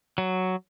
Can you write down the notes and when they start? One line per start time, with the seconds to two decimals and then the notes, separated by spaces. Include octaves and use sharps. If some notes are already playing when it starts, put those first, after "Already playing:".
0.18 F#3